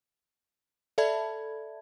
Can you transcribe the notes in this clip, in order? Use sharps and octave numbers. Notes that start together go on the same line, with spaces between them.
A4 D5 E5 A5 B5 G#6